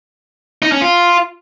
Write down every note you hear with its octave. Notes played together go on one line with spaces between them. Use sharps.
D#4
C#4
F4